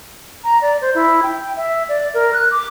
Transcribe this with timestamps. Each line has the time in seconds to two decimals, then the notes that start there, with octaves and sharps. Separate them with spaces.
0.44 A#5
0.62 D5
0.81 C5
0.95 E4
1.23 G5
1.56 E5
1.89 D5
2.14 A#4
2.34 F#6
2.51 D6